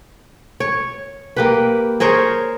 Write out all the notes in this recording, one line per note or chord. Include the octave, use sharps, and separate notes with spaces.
C#5
A#3 G4 B4
G#4 A#4 C5 C#5